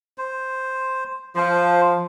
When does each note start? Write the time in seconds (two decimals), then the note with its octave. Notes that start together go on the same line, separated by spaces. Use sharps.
0.18 C5
1.36 F3 C5